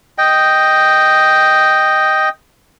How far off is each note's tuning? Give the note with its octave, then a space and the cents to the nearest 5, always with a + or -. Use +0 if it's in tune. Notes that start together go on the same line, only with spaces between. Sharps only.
D#5 +0 G5 +0